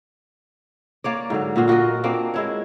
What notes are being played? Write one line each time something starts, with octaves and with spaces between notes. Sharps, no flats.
A#3 C#5 D5
G#2 D3 F#3
A#2 F4 F#4 F5
F4 F#4 A#4 D#5
A#3 C4 D4
G#3 E4 C#5